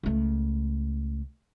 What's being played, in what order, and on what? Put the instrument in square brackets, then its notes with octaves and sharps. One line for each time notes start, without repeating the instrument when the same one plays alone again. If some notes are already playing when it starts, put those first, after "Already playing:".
[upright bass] C#2 A3